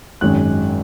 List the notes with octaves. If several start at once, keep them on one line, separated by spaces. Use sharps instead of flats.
G#1 F#2 D#3 G#3 C#4 F#6